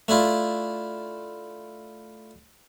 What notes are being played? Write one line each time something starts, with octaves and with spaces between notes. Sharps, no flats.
A3 D4 E4 F4